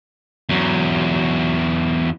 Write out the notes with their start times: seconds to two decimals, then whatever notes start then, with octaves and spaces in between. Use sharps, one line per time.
0.49 E2 F#3